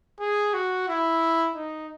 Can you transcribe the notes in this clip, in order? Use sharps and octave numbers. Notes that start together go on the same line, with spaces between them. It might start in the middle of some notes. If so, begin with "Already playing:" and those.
G#4
F#4
E4
D#4